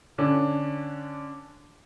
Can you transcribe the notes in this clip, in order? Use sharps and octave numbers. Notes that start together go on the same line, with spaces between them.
D3 C#4 D4